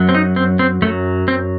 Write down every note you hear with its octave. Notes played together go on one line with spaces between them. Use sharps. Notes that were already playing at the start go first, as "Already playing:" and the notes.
Already playing: F#2 F#3
C4
D#4
C4
C4
F#2 F#3 A3
C4